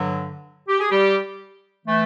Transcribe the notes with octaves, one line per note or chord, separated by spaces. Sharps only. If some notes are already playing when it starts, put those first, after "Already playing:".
Already playing: G2 D3 F#3
G4
G#4
G3 G4
E3 A3